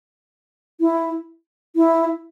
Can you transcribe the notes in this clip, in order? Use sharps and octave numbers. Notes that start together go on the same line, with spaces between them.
E4
E4